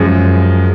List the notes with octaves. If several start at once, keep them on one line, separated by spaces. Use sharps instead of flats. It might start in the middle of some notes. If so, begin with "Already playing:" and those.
Already playing: F#2 F3 G#3